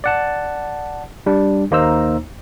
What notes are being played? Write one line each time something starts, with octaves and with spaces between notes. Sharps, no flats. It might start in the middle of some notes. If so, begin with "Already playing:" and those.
D5 F#5 A5
G3 D4
D#2 A#3 D#4 C5 A#5 E6